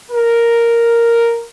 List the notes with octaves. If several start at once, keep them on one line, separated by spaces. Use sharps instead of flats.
A#4